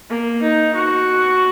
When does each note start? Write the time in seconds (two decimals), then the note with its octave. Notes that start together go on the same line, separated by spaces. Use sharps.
0.10 A#3
0.42 D#4
0.75 F#4